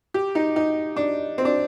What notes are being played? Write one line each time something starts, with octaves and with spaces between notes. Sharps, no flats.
G4
D#4
D#4
D4
C4
D4